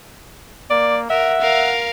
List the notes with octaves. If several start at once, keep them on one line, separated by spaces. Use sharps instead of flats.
A#3 D5
A#4 E5 F#5
A#4 F5